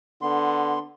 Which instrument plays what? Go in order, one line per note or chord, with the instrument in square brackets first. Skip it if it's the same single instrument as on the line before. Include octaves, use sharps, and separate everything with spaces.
[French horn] D3 [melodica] B3 C6